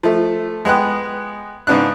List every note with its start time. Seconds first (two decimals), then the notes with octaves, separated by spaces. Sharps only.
0.03 F3 A3
0.65 G#3 B3 G5 F#6
1.67 G#2 C#3 B3 D4 F#6